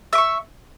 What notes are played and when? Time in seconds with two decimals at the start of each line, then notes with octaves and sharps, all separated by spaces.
0.13 E5
0.15 D6
0.18 C#6